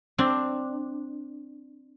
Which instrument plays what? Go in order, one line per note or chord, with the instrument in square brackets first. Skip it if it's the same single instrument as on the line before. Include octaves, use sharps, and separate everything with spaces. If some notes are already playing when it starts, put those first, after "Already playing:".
[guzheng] C4 D4